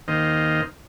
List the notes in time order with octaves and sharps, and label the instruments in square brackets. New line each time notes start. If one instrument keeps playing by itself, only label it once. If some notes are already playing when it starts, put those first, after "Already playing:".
[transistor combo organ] D#2 D#3 A#3 C5 D#5